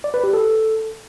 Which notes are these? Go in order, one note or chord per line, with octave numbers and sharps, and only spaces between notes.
D5
B4
G4
A4